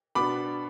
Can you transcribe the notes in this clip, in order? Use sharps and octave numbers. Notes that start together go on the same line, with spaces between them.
B2 B3 D4 B5 D6